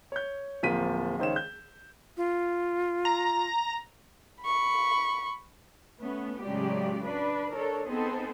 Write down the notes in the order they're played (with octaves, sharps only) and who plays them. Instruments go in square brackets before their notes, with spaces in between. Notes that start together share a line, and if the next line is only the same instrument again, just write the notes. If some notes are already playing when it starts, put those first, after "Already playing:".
[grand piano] C#5 G6
D1 F3 A#3 B6 D#7
C#2 D#3 C5 C#5 E7
G6
[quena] F4
[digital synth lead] A#5
[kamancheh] B5 C#6
[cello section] A3 B3 C#4
A2 C#3 F#3 G#3 G4 D5
D4 B4 D5
D4 A4 A#4 C#5
B3 C4 D#4 G#4 A4 C5